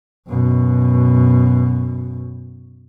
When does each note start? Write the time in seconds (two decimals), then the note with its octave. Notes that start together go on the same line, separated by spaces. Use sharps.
0.28 F#2 B2